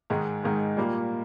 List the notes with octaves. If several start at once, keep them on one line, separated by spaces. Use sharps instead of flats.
G#2 D#3 G#3
G#2 D#3 G#3
A#2 G3 A#3